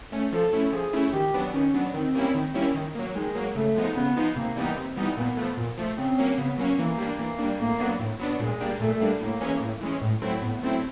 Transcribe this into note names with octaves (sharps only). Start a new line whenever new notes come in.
A3 C#4
F3 A4
A3 C#4 E4
F3 G#4
A3 C#4 E4
D#3 G4
F#3 B3 D4
D#3 C#4
F#3 B3 D4
D#3 C4
G3 A#3 C#4 E4
D#3
G3 A#3 C#4 E4
D#3
F#3 A#3
D#3 G#3
F#3 A#3
C#3 A3
F3 G#3 B3 D#4
C#3 B3
F3 G#3 B3 D#4
C3 A#3
E3 G3 B3 D#4
C3
E3 G3 B3 D#4
A#2 B3
F3 A3
A#2
F3 A3
C#3 C4
F#3 A#3 C#4
C#3 B3
F#3 A#3 C#4
E3 A#3
G3 A#3 D4
E3 A#3
G3 A#3 D4
A2 A#3
F#3 B3 D4
A2
F#3 B3 D4
A#2 G#3
G3 A#3 D4
A#2 A3
G3 A#3 D4
A2 A#3
E3 G#3 C#4
A2
E3 G#3 C#4
A2
F#3 A3 C4 E4
A2 B3
F#3 A3 C4 E4